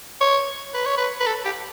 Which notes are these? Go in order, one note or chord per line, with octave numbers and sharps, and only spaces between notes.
C#5
B4
C#5
B4
B4
A4
G4